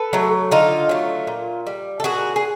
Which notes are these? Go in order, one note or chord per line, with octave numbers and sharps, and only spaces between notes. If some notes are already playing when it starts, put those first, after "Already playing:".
Already playing: A4 B4
F#3 A3
D3 D#4 F4
F#3 A3
A#2
G3
A4
A#2 F#4 G#4
G#4